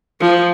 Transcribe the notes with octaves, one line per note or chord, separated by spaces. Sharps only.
F3